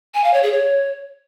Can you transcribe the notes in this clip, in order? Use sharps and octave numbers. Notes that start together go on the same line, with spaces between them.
G#5
F5
C#5
G#4
C#5